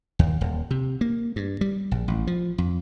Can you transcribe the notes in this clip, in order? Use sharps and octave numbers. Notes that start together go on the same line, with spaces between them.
D#2
D#1
C3
A#3
G2
G3
A#1
A1
F3
F2